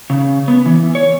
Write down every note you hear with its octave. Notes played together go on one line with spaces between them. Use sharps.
C#3
B3
E3
C#5